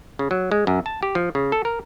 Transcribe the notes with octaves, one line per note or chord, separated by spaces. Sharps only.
C#3
F#3
G#3
F#2
A5
G4
F3
C#3
A4
A#4